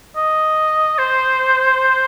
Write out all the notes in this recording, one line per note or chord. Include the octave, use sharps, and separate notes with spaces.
D#5
C5